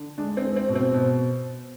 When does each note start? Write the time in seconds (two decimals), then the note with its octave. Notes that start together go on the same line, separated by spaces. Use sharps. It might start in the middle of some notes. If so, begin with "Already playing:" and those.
Already playing: D3
0.18 G#3 D4
0.37 C4
0.44 G#3
0.56 C4
0.69 B2
0.75 C4
0.94 B2